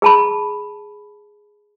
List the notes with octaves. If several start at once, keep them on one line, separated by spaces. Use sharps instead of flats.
G#4 A5 B5